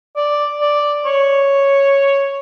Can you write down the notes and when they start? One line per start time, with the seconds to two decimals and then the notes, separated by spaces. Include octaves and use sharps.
0.16 D5
0.61 D5
1.05 C#5